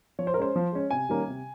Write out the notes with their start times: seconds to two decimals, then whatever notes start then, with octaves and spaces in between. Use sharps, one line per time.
0.19 F3 C#5
0.27 C5
0.34 A#4
0.37 G#3 C#4 C5
0.56 F3
0.72 G#3 C#4
0.91 C3 G#5
1.09 D#3 G3 A#3 C#4
1.28 C3